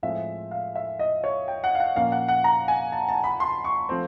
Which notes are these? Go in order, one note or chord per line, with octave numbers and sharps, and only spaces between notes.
A2 F3 G#3 C4 E5
F5
E5
D#5
C#5
G5
F#5
F5
F#5
A#2 F3 A#3 C#4 F5
F#5
F#5
A#5
G#5
A5
A5
B5
C6
C#6
F3 A3 C4